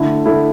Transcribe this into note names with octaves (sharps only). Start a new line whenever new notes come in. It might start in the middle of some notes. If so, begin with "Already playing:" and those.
Already playing: D3 A3 E4
D3 A3 E4